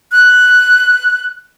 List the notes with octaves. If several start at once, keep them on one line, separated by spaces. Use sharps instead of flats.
F#6